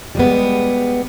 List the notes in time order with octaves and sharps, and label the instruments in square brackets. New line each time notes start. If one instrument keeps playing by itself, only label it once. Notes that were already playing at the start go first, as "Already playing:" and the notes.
[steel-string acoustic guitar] G3 G#3 B3